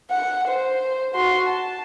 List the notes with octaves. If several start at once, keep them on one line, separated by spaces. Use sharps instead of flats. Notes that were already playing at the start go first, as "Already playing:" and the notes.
F#5
C5
F#4 C6
A5